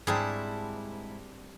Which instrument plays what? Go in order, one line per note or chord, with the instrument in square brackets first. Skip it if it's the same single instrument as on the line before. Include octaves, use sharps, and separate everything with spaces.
[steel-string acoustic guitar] G#2 E4 A5 [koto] G3 C4 D4 [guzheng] G#4